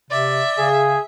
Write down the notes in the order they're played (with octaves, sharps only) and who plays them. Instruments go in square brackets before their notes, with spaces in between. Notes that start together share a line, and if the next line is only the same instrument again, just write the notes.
[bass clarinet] C3 [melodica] D5 [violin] E5
[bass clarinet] C#3 [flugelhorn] G#4